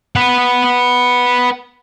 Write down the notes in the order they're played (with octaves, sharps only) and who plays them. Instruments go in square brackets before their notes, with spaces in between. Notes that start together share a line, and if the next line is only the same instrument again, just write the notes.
[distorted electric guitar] B4 F#5